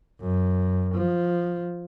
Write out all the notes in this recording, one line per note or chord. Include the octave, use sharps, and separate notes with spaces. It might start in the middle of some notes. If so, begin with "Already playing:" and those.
F#2
F3